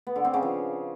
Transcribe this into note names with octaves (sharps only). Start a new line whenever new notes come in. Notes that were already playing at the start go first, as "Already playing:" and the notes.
B3
D3
C4
C#3
F3